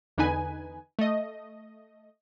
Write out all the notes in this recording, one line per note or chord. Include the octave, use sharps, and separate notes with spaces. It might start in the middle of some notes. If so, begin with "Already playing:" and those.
E2 D3 D#4 B4 G#5
A3 D#5